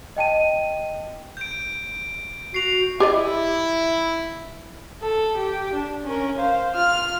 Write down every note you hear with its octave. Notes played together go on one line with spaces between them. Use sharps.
D#5 G5 A5 D#7
G6 D7
F#4 C7 F7
E4 G4 D5 D#5
A4
G4
D4
C#4 A#4
C5 F5
F4 F6